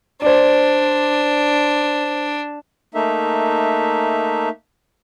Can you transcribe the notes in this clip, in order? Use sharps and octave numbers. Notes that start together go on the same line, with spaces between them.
D4 C5 D5
A3 A#3 D#4 E5